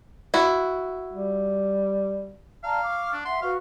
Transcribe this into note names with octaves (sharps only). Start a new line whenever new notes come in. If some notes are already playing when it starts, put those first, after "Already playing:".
E4 F#4
G3
D5 F5 A5 A#5
C#6 D6 F6
D4
E5 F#5 C6
F#4 B4 F5 C#6